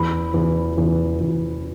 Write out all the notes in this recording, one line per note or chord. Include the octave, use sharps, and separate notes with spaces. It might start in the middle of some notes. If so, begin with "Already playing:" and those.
Already playing: E2 B5
E2
E2
E2